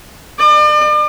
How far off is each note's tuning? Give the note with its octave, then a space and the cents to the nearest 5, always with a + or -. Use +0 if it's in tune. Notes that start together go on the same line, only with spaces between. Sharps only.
D5 +40